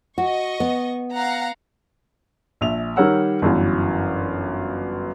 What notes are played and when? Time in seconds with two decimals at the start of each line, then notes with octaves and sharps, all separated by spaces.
0.18 F#4 D#5 C#6
0.60 B3
1.14 F5 F#5 A#5
2.61 A#1 E5 F7
2.96 D#3 G3 A#4 C#5 F#5 E6
3.42 G1 F#2 E3